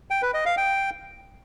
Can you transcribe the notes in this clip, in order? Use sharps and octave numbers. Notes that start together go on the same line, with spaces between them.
G5
B4
D#5
F5
G5